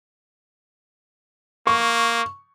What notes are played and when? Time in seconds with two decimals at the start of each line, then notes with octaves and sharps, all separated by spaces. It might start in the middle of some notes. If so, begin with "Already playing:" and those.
1.67 A#3 C#6